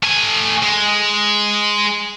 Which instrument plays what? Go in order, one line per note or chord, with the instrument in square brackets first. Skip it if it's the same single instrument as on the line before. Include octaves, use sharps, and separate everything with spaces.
[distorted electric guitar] A3 G#5
G#3